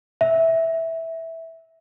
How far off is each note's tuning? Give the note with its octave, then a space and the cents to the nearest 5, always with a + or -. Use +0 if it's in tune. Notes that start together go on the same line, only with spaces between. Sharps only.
E5 -10